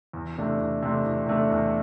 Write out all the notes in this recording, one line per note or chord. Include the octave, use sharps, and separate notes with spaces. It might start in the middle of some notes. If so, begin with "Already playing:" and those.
E2
C3 A3 D4
E2
C3 A3 D4
E2
C3 A3 D4
E2